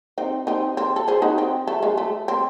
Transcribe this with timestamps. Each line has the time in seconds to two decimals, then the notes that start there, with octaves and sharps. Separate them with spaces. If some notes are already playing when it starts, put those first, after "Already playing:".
0.18 C4 D#4
0.47 C4 D#4
0.77 C4
0.96 A4
1.08 G#4 C5
1.22 D#4 F#4
1.38 C4
1.67 A3
1.83 G#3
1.97 A3
2.28 C4